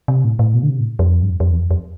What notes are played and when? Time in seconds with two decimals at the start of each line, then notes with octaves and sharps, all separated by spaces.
0.08 C3
0.24 A2
0.39 A2
0.54 B2
0.63 D3
0.70 C3
0.79 A2
0.99 F2
1.23 G2
1.30 F2
1.40 F2
1.51 E2
1.60 F2
1.71 F2